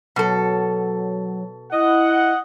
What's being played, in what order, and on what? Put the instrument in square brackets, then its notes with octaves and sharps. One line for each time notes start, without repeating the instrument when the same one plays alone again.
[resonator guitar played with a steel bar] B2 A4 [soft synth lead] F#3
[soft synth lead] E4 [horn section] D#5 F#5